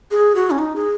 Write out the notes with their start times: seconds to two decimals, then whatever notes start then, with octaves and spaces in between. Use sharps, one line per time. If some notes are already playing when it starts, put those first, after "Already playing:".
0.11 G#4
0.35 F#4
0.51 C#4
0.59 D#4
0.76 G#4